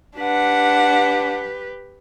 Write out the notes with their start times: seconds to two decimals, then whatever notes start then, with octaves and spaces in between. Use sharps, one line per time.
0.18 D4 G4 B4 F#5